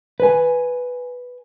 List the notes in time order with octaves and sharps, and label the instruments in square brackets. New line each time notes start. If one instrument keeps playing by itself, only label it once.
[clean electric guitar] B4 G#5